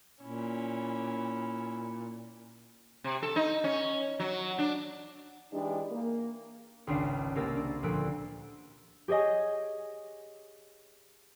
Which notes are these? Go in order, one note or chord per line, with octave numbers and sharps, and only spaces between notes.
A#2 C#4 E4
C3
A4
D#4
C#4
F#3
D4
E3 G#3 D4 D#4 G4
A#3
G#1 C#2 D4 F5
C2 A#3 A#4 E6 A6
D4
D2 A#2 F3 E6 F#6 D7
G4 G#4 C#5 D#5 G#5